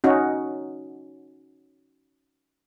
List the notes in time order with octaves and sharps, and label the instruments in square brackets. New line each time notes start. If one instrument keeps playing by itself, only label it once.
[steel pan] C#4 D#4 F#4